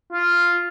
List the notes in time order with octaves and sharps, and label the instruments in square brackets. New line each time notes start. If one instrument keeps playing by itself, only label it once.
[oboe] F4